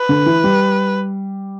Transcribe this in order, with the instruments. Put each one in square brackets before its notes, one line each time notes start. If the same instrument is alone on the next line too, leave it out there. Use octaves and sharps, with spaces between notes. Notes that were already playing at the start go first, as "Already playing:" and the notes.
Already playing: [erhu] B4
[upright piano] D3
E3
G3